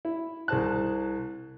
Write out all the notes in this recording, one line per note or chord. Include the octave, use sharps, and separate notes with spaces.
E4
C2 G#4 C5 A5 F#6